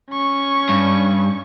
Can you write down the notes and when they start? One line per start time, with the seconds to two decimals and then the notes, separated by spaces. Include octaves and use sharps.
0.10 C#4 C#6
0.69 G2